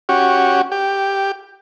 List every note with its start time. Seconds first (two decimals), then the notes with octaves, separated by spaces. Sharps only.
0.09 C#4 F#4 G4
0.72 G4